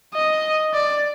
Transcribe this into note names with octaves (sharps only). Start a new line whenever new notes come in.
D#5
D5